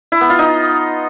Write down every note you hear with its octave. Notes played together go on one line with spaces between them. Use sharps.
E4
B3
F4
D#4